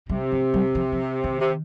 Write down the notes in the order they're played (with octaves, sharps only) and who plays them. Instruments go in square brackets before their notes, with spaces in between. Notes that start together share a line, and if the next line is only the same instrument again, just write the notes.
[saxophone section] C3 [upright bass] G3
[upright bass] F3
G3
F3
F3
D#3
[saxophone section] C3